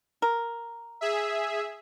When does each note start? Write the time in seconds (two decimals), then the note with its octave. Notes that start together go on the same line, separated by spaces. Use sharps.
0.22 A#4
1.01 G#4 E5